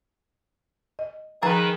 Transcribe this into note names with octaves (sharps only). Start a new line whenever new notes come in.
D#5
D#3 F3 G#4 A#4 B4 A#5